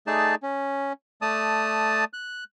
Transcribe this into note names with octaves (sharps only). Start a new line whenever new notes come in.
A3 D#4 G#4 D5 A5
C#4
A3 D5 A5 D#6
F#6